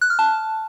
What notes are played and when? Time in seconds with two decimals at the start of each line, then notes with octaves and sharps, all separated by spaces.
0.01 F#6
0.10 F6
0.19 A5